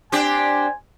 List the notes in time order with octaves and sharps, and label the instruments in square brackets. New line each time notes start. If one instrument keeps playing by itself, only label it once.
[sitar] C4 D4 G4 [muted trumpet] G#5